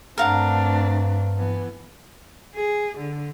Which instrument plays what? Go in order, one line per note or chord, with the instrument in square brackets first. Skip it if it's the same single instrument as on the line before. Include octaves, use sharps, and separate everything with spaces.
[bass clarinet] G2 [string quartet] A3 C4 D4 [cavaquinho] A#4 F5 F#5
[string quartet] E3 B3
[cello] G#4
D3